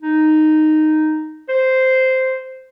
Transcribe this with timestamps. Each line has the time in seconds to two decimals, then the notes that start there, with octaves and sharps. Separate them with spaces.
0.02 D#4
1.49 C5